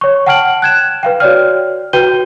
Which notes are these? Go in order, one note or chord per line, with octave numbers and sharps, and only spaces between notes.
C#5 C#6
F#5 G5 A5 F6 D7 F#7
F#6 G#6 E7
B4 F5 G5
F#4 C#5 D5 F6
F#4 B4 G5 G6 D#7 G7